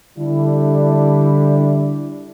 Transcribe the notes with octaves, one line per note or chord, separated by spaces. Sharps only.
D3 G3 D4 E4